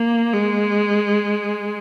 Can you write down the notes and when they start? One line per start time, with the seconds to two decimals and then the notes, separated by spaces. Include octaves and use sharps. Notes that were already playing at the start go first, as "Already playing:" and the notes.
Already playing: A#3
0.33 G#3